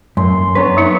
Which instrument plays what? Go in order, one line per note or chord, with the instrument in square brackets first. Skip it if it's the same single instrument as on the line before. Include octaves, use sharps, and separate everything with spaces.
[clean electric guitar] F#2 [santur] C6
[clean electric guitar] B3 D4 B4 [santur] C#5 A#5
[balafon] F#3 D#4